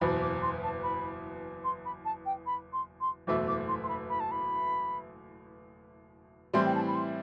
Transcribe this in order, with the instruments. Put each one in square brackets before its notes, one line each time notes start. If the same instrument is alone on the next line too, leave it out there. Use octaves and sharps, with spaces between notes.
[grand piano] F#1 E2 B2 [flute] B5
[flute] D6
C6
A5
B5
C6
B5
A5
G5
B5
C6
C6
[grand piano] F#1 E2 B2 A3 E4 [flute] D6
[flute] D6
C6
C6
B5
B5
A5
B5
[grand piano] A2 E3 G3 C4 [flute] C6
[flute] G5
A5
B5
C6